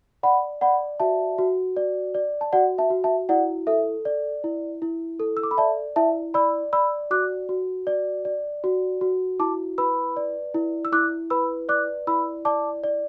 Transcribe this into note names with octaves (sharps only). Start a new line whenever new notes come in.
D5 F#5 B5
D5 F#5 B5
F#4 E5 A5
F#4
D5
D5
A5
F#4 D5 F#5
E5 A5
F#4
E5 A5
E4 D5 F#5
A4 E5
D5
E4
E4
A4
E6
D6
B5
D5 E5 A5
E4 E5 A5
D5 B5 E6
D5 B5 E6
F#4 D6 F#6
F#4
D5
D5
F#4
F#4
E4 A5 D6
B4 B5 E6
D5
E4
E6
E4 D6 F#6
B4 B5 E6
D5 D6 F#6
E4 B5 E6
D5 A5 D6
D5